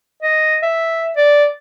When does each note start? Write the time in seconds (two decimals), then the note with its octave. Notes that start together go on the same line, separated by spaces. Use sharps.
0.23 D#5
0.63 E5
1.17 D5